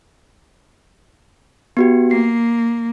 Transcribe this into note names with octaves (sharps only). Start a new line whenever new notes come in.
B3 F#4 G4
A#3 C7